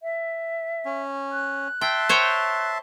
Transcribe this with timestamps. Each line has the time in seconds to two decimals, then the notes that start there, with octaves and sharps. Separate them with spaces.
0.03 E5
0.85 C#4
1.32 F#6
1.81 E5 G5 A5 C6
2.09 C5 C#5 G5